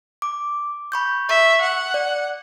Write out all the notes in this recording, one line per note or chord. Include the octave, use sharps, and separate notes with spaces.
D6
B5 C#6 G6
E5 C#6
F#5
D5